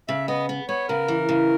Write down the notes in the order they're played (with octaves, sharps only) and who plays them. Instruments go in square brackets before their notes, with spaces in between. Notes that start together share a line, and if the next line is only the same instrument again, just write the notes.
[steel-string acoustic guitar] C#3 [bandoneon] E5
[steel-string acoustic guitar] B3 [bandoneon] D#5
[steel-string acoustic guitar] B3
[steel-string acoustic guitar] B3 [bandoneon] C#5
[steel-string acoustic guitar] C#3 [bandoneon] A#4
[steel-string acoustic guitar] E3
C#3